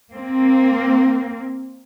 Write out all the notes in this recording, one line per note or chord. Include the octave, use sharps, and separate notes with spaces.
A#3 C4